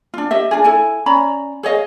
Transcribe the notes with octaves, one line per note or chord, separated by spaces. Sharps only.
D4 F4
G4 D#5 E5
D4 F4 G#4
E4 A4 G#5
C#4 D5 A#5 B5
G#4 C#5 D#5 F5